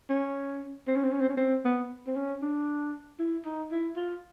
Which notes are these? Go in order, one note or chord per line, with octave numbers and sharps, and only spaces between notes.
C#4
C4
C#4
C4
C#4
C4
C#4
C4
B3
C4
C#4
D4
E4
D#4
E4
F4